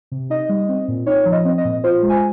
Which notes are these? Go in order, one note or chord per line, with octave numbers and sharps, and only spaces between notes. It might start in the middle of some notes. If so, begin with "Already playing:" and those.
C3
D#4 D#5
G3
C4
A#2
D#4 C#5
F3
D#5
C4
D#5
A#2
F4 C5
G#3
G#5